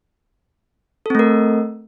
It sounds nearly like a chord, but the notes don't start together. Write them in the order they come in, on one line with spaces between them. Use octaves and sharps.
A4 C4 A3 A#4